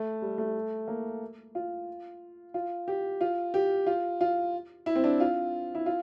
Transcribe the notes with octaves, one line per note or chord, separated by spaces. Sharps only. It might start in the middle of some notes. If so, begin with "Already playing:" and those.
Already playing: A3
G3
A3
A#3
F4
F4
G4
F4
G4
F4
F4
E4
C4
D4
F4
E4
F4